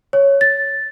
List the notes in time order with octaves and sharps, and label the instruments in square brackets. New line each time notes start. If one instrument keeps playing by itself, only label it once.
[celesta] C#5
A6